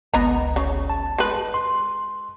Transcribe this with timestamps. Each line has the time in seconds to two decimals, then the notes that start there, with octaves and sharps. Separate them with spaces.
0.14 G1 C#2 B3 D#5 A#5
0.56 C#3
0.90 A5
1.18 G#3 B4
1.54 C6